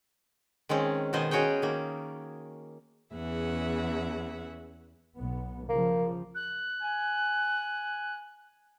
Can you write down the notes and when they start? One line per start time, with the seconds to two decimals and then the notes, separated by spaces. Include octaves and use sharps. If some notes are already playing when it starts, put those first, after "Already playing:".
0.69 D#3 G#3 C4 C#4
1.13 B2 D#3 B3 C5 D#5 G#5
1.31 G#3 C#4 F#4 G#4 C#5 G5
1.62 D#3 A#3
3.13 E2 C#4 G#4 E5 F#5
5.16 B1 B3
5.69 C#3 F3 A#3
6.35 F#6
6.82 G#5